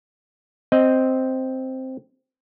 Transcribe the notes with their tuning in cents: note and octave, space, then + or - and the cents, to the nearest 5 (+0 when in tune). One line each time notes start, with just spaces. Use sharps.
C4 +0 D#5 +0